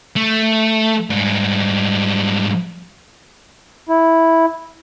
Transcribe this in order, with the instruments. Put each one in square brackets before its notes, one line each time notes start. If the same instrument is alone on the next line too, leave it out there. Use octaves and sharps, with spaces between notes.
[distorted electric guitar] A3
G#2 G3
[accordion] E4